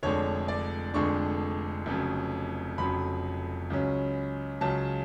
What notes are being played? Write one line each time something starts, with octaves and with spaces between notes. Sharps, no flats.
F1 F2 D3 G#3 D4 C#5
D5
F1 F2 D3 G#3 D4 C#6
F1 F2 C#3 F#3
F1 F2 C#3 F#3 B5
C#2 C#3 F#3 C#4
C#2 C#3 F#3 C#4 A5